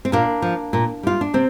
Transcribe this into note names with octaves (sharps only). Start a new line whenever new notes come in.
C4
A#2 A#3 D4
F3
A#2
G3 F4
D4
C3 C4